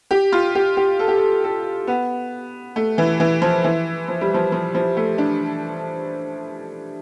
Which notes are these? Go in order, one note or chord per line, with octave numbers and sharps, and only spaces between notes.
G4
F4
G4
G4
A4
G4
A4
A4
B3
A3
E3
E3
F3
E3
F3
G3
F3
F3
F3
A3
D4